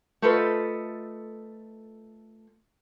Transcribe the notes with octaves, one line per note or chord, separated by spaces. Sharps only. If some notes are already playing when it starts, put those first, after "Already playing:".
A3 F4 A4 B4 C5 D#5